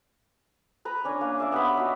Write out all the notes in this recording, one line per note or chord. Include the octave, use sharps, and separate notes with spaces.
B4 A#5 B5
C#4 D4 G#5
A#3
D5 E5 F5
B3 C#4 G4 B5
D#4 F#4